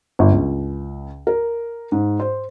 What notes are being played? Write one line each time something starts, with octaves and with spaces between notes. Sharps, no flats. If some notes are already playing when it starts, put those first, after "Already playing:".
G1
C#2
A#4
G#2
C5